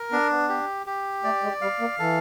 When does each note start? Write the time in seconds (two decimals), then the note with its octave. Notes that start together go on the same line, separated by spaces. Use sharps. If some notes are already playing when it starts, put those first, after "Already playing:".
Already playing: A#4
0.12 B3 D4
0.30 B3
0.49 G4
0.86 G4
1.24 A3 D5
1.43 G#3
1.62 G3 F5
1.80 A#3
1.99 E3 A4